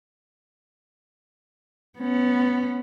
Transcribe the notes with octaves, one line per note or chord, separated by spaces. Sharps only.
B3 C#4